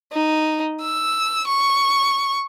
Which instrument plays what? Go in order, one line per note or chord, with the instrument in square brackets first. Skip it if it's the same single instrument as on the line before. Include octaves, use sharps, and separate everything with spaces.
[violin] D#4
E6
C#6